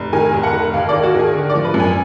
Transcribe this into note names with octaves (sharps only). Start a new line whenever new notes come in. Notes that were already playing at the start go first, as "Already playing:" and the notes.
Already playing: F1
D#3 G#5
F1
F#5
D#3
D#2 F5
D#3 D5
F#4
D#3 G#4
D3
D5
F3
B4
F#2
G#5